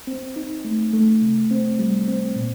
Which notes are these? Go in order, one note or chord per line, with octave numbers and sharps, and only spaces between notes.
C4
D#4
A3
A3
C3
C4
G3
C4
A#2